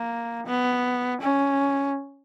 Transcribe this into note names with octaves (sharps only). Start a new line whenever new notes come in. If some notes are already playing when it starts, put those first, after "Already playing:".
Already playing: A#3
B3
C#4